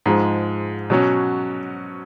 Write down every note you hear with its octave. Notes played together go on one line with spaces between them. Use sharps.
G#2 F3 G#3
B2 F#3 C#4